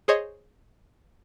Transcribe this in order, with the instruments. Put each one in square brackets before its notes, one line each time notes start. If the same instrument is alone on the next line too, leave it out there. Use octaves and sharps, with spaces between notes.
[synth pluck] G#4 C5 C#5 D#5